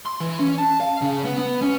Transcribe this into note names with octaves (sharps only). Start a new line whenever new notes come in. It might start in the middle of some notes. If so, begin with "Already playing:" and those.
C6
E3
C#4
A5
F5
C#3
B3
B3
C#4